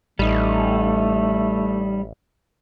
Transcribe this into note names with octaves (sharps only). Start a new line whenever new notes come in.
A1 G3 A3 D#4